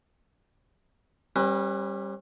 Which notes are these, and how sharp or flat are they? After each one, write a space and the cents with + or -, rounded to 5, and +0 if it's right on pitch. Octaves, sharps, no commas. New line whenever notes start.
G3 +5 C#4 -40 B4 +0